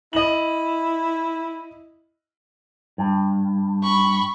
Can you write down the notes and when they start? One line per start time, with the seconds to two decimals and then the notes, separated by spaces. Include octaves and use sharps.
0.13 E4 D#5 F#7
2.98 G2
3.83 B5 C#6